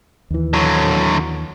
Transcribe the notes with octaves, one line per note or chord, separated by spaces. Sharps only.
D#2 E3
D3 F#3